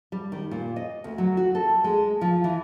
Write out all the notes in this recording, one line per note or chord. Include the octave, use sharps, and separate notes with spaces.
G3
D#3
A#2
D#5
D2
F#3
F#4
A4
G#3
F3
E3